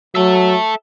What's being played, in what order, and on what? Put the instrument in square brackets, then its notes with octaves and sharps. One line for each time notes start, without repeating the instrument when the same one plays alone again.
[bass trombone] F#3 [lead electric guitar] A4 E5